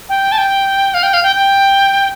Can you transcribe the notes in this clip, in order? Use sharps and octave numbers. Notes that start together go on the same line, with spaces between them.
G5
A5
G5
F5
G5
F5
G5
G5